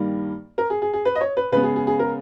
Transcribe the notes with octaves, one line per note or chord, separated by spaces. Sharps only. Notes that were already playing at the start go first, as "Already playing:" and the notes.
Already playing: G2 D#3 G3 A#3
A#4
G#4
G#4
G#4
B4
D#5
C#5
B4
C#3 G#3 B3 B4
G#4
G#4
G#4
A#4